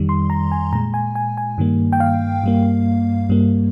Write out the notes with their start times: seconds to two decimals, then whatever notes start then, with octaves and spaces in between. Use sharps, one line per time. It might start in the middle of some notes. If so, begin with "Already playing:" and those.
Already playing: F2 D#3 G3
0.09 C6
0.30 A#5
0.52 G#5
0.72 A#2 A#5
0.75 G#3
0.94 G#5
1.15 G#5
1.37 G#5
1.58 G2 D#3 G3 A#3
1.93 G5
2.00 F5
2.44 G2 G3 A#3
3.29 G2 G3 A#3